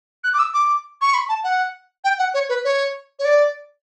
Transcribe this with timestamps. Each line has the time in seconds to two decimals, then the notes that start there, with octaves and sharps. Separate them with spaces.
0.24 F#6
0.33 D6
0.39 E6
0.53 D6
1.01 C#6
1.14 B5
1.28 A5
1.43 F#5
2.04 G5
2.18 F#5
2.34 C#5
2.49 B4
2.64 C#5
3.19 C#5
3.24 D5